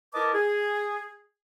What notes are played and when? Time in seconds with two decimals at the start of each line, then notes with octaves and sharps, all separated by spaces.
0.14 E4 A#4 B4 D#5 A5 D6
0.33 G#4